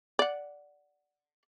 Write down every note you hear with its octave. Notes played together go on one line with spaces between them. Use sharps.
D5 F#5